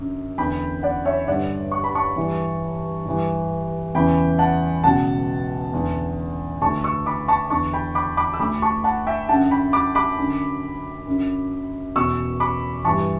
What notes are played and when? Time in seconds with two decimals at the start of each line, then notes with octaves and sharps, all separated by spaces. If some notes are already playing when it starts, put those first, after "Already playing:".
Already playing: F#2 D3
0.38 E2 D3 G5 B5
0.83 D5 F#5
1.05 C#5 E5
1.27 G2 D3 D5 F#5
1.71 C#6
1.84 B5
1.95 A5 C#6
2.16 G2 E3
3.06 G2 E3
3.95 E2 C#3 E3 G5 B5
4.39 F#5 A5
4.84 C#2 B2 F#5 A5
5.73 E2 D3
6.62 D2 D3 A5 C#6
6.84 C#6 E6
7.06 B5 D6
7.28 A5 C#6
7.50 E2 D3 A5 C#6
7.73 G5 B5
7.95 B5 D6
8.17 B5 D6
8.34 E6
8.39 D2 D3 B5 D6
8.62 A5 C#6
8.84 F#5 A5
9.07 E5 G5
9.28 F#2 D3 F#5 A5
9.51 G5 B5
9.73 B5 D6
9.95 B5 D6
10.18 F#2 D3
11.07 F#2 D3
11.96 E2 B2 C#6 E6
12.40 B5 D6
12.84 G2 E3 A5 C#6